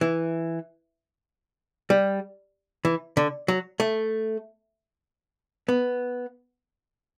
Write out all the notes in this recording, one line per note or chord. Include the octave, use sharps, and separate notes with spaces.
E3
G3
E3
D3
F#3
A3
B3